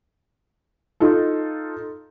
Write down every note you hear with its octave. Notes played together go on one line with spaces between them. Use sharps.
D#4 F4 A4